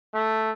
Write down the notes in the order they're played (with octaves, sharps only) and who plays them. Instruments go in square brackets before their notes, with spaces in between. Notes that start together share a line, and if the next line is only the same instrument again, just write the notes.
[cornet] A3